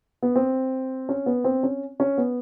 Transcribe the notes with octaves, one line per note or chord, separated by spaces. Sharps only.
B3
C4
C#4
B3
C4
C#4
C#4
B3